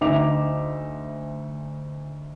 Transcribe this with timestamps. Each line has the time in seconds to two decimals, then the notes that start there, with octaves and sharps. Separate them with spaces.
0.01 D2 D#4 E5 D6 F7